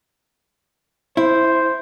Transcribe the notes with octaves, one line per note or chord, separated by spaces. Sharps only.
E4 C5